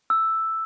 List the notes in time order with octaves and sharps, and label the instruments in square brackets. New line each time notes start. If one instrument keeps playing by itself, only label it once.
[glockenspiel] E6